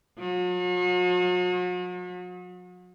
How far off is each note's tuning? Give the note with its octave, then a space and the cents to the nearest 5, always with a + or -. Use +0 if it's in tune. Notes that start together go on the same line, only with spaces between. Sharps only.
F#3 -45